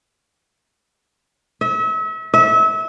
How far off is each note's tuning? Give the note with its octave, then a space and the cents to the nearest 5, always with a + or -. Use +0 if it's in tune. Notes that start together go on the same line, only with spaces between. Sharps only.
E5 -35
E5 -30